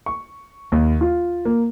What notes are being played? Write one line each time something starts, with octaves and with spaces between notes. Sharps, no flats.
C#6
D#2
F4
A#3